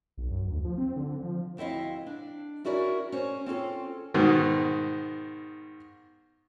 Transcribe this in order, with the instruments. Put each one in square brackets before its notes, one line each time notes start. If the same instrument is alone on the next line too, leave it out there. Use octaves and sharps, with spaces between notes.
[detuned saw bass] B1
F#2
D2
F3
C4
D3
F3
[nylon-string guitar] D2 C4 E4 D#5 F5
D4
C#4 E4 F#4 A#4 D5
C#4 C5
C4 C#4 F4 A4
[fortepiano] G#2 B2 D#3